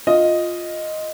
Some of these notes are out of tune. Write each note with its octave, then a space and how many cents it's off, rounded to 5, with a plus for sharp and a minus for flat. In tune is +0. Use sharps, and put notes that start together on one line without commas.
F4 +5 D#5 +0